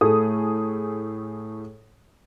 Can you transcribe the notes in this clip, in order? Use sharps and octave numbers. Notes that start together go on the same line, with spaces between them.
A2 A3 G#4 D#6